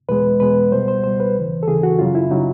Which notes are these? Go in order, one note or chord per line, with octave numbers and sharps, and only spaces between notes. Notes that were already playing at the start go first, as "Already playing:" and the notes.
E2 B2 G#3 B4
E2 B2 G#3 B4
C#2 B2 G3 C5
C5
C#2 B2 G3 C5
B4
D#2 C#3 E3
A4
D#2 C#3 E3 G#4
F#4
F#2 C#3 F#3 F4
E4
C#3 F#3 D#4